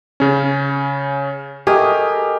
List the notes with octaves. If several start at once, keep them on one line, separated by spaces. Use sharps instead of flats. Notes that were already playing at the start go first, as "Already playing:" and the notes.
C#3 C#4
A3 G4 G#4 A#4 D#5